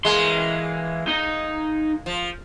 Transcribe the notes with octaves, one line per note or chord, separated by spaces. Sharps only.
E3 G#3 A#3 C6
D#4
F3